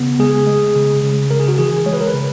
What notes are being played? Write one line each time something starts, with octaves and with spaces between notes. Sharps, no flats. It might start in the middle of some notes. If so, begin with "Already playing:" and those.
Already playing: C#3 B3
G#3 G#4
G#3
C#3
C#3
C#3 A#4
G#4
F#4
E3 G#4
G#3 C#5
B4
A#4
B4
C#3